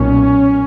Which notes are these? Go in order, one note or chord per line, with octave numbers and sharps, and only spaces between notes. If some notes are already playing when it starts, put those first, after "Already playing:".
Already playing: B1 A#2 C#4